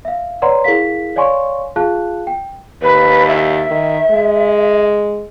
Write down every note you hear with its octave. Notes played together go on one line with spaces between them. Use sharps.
E5 F5
B4 C#5 D5 F#5 A#5 C6
E4 G#4 A#4 F5 B6
C#5 D5 F5 G#5 C6 C#6
F4 G#4 F5 A5 F#6
G5
D#2 B4
E5
D#3
G#3